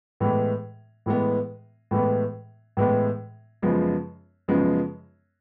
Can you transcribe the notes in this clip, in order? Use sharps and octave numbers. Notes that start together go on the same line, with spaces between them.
A2 E3 G#3 B3
A2 E3 G#3 B3
A2 E3 G#3 B3
A2 E3 G#3 B3
F#2 C#3 F3 G#3 B3
F#2 C#3 F3 G#3 B3